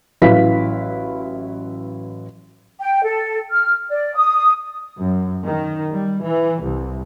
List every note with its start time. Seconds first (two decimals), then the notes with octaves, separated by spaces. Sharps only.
0.22 A1 F#3 E4 B4 F5 B6
2.79 G5
3.03 A4
3.51 F6
3.90 D5
4.15 D#6
4.99 F#2
5.46 D#3
5.94 G3
6.24 E3
6.63 C2